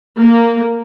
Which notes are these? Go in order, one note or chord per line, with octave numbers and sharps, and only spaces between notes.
A#3